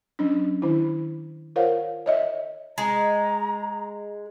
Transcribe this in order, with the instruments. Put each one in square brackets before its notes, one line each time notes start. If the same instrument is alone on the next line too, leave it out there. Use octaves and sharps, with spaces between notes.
[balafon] F#3 C#4 D4
D#3 E4
F4 A#4 C5 C#5 F5 F#5
C#5 D#5 E5
[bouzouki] G#3 [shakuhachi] A#5